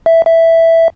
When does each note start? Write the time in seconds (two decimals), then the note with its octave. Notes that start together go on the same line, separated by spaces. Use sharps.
0.06 E5
0.26 E5